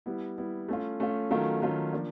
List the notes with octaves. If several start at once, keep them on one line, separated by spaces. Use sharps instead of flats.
G3 B3 E4
G3 B3 E4
A3 C#4 F4
A3 C#4 F4
D#3 F#3 A3 C#4 F4
D#3 F#3 A3 C#4 F4
F3 A#3 D4